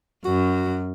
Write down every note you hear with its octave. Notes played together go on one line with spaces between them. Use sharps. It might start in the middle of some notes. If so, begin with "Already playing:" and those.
F#2 F#4